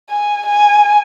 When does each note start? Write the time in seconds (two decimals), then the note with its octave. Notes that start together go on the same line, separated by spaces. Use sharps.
0.10 G#5
0.46 G#5